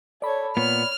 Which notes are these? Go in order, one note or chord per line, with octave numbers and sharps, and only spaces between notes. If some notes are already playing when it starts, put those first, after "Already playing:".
A4 C#5 D5 B5
A#2 B3 C#5 F6